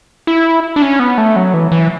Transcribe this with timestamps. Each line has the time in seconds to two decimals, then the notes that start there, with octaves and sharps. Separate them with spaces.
0.27 E4
0.76 D4
0.82 C#4
1.00 B3
1.18 A3
1.36 F#3
1.54 E3
1.72 E3